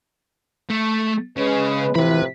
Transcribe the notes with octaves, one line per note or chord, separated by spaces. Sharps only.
A3
C#3 G#3 B4
A2 C3 E3 F3 B4 B5